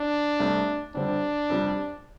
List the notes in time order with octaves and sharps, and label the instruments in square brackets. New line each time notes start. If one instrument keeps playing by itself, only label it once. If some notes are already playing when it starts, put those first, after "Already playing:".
Already playing: [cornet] D4
[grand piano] C2 C3 A3
[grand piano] F2 D3 G3 C4 [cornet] D4
[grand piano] F2 C3 G3